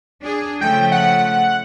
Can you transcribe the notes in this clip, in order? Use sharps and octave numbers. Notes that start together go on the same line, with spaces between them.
D4 G#4
C#3 F3 A3 G5
F#5